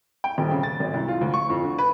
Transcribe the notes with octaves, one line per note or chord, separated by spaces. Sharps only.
G5
D#1
C#3
A6
G#1
C2
F4
D2
C#6
F2
D3
B4